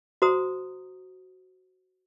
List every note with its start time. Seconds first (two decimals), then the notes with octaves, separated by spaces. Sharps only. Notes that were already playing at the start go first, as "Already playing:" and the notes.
0.22 F#4 C5 A#5 D#6